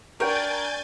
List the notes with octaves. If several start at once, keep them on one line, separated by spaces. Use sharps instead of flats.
D4 A#4 C#5 G5 G#5 G6 A6